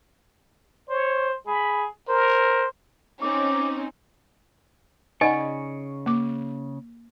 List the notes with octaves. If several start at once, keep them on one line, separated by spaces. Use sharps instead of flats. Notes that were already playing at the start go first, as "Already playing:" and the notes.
C5 C#5
G#4 B5
A#4 C5
C4 C#4 D#4 D6
C#3 D#4 D5 D#5 F#5 G#5 C#6
A#3 D6